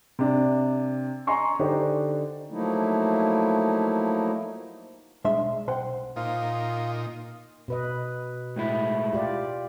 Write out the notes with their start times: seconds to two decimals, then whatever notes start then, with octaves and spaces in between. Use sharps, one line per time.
0.19 C3 D4
1.27 D#5 G#5 A#5 C6 C#6
1.59 D3 D4 D#4 G4 C5
2.50 F3 F#3 A3 A#3 D#4 E4
5.24 B1 G#3 D4 E5 C6
5.68 B1 C5 F#5 G5
6.16 A#2 D#4 F4
7.68 B2 B4 D#5
8.56 A2 G#3 E4
9.13 F4 G4 D5